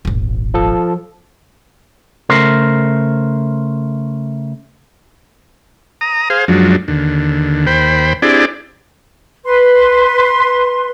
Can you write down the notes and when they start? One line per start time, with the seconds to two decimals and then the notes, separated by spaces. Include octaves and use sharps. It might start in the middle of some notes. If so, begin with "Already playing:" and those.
0.05 D#1 G#1
0.54 F3 A4
2.29 C#3 A3 A#4 C5
6.01 A#5 D#6
6.30 G#4 C5 F5
6.48 F#2 F3 F#3 G#3 D4
6.88 D#2 D3
7.67 D#2 C5 G5 B5
8.22 C4 D4 E4 G4 G#4 D5
9.44 B4 C6